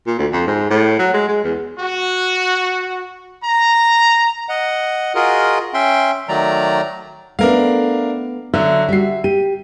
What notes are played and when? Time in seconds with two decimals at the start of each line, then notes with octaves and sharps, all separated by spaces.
0.07 A#2
0.18 D2
0.32 F2
0.47 G#2
0.70 A2
0.99 F#3
1.14 G#3
1.28 G#3
1.44 E2
1.79 F#4
3.45 A#5
4.49 D#5 F#5
5.15 F4 F#4 G#4 A#4 D#5
5.74 C#4 E5 G5 C6
6.29 D#3 F#3 A3 D5 A#5
7.39 A3 B3 D4 A#4 F5
8.54 D3 F#3 E5
8.89 G3 F#4 E5 C7
9.24 G4 D#7